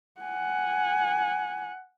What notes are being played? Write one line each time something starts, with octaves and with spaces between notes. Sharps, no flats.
F#5 G#5